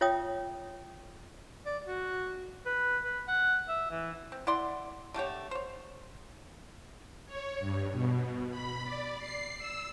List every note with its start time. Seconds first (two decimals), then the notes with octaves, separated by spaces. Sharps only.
0.01 F4 C#5 E5 G5 D#6
1.66 D5
1.85 F#4
2.66 B4
3.03 B4
3.28 F#5
3.68 E5
3.91 E3
4.32 C4
4.47 E4 D5 F#5 C6
5.14 D3 A3 G4 C#5
5.51 C5 C#5
7.26 C#5
7.59 G2
7.92 B2
8.50 B5
8.83 D5
9.18 C7
9.58 E6